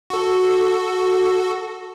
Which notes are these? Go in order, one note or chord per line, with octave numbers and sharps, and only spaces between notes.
F#4 A4